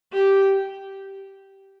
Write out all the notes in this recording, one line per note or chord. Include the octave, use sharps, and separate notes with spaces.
G4